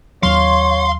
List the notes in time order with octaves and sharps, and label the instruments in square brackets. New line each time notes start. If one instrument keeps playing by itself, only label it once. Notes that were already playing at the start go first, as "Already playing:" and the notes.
[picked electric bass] D#2 F#3 [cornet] C#5 [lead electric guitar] F5 [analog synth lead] C6